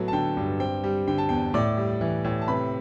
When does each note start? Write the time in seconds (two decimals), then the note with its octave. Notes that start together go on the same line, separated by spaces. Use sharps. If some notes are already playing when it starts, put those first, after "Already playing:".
Already playing: A2 F#3 B3 A4
0.08 A5
0.13 D3 G5
0.37 G2
0.60 C4 G5
0.84 G3
1.08 D3 G5
1.18 A5
1.29 E2 G5
1.54 A2 D5 D6
1.77 G3
2.01 E3
2.24 A2
2.42 A5
2.48 C3 B4 B5